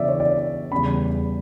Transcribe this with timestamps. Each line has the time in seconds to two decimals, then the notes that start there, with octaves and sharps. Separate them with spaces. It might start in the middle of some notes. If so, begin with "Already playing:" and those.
Already playing: C#3 E3 B3 E4 D5 E5
0.09 C#5
0.20 D5
0.71 E2 C#3 G3 C#4 B5